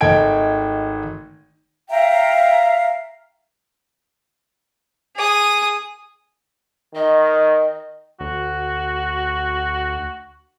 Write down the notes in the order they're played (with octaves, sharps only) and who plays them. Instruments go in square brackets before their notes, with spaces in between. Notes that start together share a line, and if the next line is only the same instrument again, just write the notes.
[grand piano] G#1 A3 D#4 G5 G#6 D7
[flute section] E5 F5 G5 A#5
[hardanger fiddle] G#4 D#6
[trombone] D#3 [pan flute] D#5
[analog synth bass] D2 [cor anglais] F#4